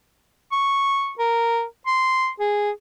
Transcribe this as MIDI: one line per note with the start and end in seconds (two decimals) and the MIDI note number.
0.52 1.12 85
1.19 1.64 70
1.86 2.29 84
2.40 2.70 68